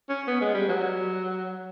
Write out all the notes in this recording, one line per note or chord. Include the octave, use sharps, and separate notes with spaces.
C#4
B3
G#3
G3
F#3